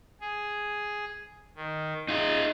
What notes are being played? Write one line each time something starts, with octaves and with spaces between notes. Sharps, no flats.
G#4
D#3
D#4 F4 G#4